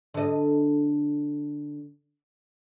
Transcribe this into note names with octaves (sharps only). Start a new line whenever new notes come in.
D3 D#5